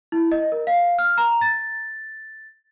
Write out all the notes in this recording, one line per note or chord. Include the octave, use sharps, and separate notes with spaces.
E4
D#5
A#4
F5
F6
A#5
A6